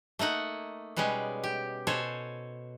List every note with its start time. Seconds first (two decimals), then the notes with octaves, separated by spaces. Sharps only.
0.19 A3 A#3 D#4 F#5
0.96 B2 G3 G#3 B3 C#4
1.43 G4
1.87 B2 A4 C5 C#5 G#5